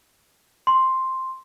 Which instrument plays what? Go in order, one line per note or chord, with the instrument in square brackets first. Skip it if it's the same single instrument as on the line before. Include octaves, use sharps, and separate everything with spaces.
[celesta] C6